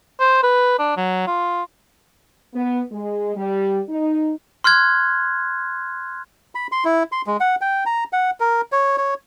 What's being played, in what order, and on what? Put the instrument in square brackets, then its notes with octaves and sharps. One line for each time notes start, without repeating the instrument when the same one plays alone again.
[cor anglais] C5
B4
D4
F#3
F4
[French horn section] B3
G#3
G3
D#4
[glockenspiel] C6 F6 F#6 G#6
[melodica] B5
C6
E4
C6
G#3
F#5
G5
A#5
F#5
A#4
C#5
C#5